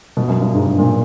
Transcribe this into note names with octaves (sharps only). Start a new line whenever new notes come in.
B2
F#2
G2
G#2
B2
A#2